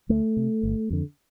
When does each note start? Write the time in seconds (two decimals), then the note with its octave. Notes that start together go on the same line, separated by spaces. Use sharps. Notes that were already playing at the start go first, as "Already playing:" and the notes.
0.09 D2 A3
0.37 C3
0.63 G1
0.90 F2 D3